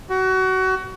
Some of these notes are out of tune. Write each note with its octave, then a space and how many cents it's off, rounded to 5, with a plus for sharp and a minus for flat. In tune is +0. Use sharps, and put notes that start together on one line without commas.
F#4 +25